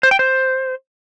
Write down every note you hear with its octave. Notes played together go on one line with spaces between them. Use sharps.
C5
G5
C5